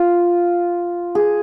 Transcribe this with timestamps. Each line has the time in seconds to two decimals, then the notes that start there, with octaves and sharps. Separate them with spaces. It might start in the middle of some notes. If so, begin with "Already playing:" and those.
Already playing: F4
1.15 G#4